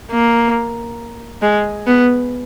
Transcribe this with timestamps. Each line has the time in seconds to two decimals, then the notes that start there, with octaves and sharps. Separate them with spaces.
0.11 A#3
1.42 G#3
1.87 B3